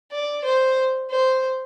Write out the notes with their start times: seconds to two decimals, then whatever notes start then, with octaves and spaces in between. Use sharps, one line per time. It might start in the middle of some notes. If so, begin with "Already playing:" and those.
0.12 D5
0.44 C5
1.10 C5